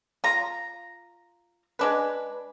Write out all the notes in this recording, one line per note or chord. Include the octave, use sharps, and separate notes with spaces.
F4 A#5
G#3 D4 B4